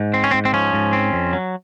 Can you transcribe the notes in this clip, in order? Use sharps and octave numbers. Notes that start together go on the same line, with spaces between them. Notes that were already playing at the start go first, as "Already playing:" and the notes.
Already playing: G#2
C4
C#4
G#2 C4
C4
F3 C#4
G#2
C4
F2
F#3